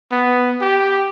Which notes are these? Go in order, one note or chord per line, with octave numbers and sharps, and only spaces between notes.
B3
G4